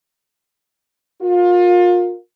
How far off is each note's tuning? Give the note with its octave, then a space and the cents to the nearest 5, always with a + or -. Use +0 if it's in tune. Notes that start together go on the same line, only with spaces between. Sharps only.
F4 +30 A#4 +0